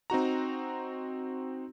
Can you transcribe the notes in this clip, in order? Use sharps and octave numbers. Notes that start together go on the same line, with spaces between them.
C4 D#4 F#4 A#5